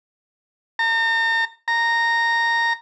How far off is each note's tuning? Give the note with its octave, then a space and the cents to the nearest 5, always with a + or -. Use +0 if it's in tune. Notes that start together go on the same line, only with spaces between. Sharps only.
A#5 -40
A#5 -10